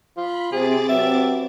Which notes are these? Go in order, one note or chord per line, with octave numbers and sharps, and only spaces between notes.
F4 B5
C3 C4 G#4 D6 A6
F#3 B3 G4 E5